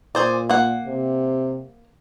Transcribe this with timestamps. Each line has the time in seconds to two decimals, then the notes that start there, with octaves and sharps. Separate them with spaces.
0.15 A#2 G#4 C5 D5
0.49 A#3 F#5
0.86 C3